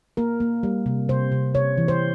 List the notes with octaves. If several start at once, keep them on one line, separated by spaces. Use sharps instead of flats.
A#3 A#4
A#3
G3
C3
C3 C5
C3
C3 C#5
E3
C5